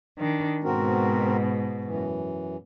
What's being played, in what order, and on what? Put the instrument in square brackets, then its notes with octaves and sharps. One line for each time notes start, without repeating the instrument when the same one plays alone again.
[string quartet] D#3 D4
[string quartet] G#2 B2 [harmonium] C4 F#4 A#4
[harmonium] F#2 E3